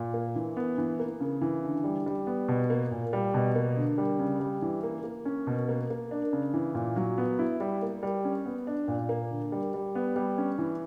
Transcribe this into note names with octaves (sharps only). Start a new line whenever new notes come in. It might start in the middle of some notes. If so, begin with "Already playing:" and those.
Already playing: A#2
A#3
E3
B3
E3
A#3
C#3
E3
D3
G3
G3
B3
B2
A#3
A#2
G3
B2
A#3
D3
G3
C#3
G3
E3
A#3
A#3
C#4
B2
A#3
A#3
D4
C#3
E3
A#2
F#3
B3
E4
G3
A#3
G3
C#4
B3
D4
A#2
A#3
D3
G3
G3
B3
G3
C#4
E3